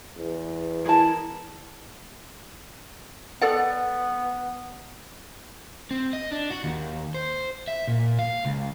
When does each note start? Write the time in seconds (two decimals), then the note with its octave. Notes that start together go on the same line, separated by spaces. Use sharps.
0.17 E2
0.86 E4 G#4 A#4 A5
3.41 B3 A4 D5 F#5
5.91 C4
6.13 D#5
6.31 D4
6.50 F#4
6.64 D#2
7.14 C5
7.68 E5
7.87 A#2
8.19 F5
8.45 C#2